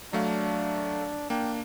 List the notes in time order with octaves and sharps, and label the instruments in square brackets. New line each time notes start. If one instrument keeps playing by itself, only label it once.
[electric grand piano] F#3 A3 F5 [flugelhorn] D4
[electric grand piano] A#3 D4 [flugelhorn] G5